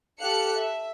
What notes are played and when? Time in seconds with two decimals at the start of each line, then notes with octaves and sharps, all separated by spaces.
0.21 G4 A4 F5 F#6 C#7
0.58 E5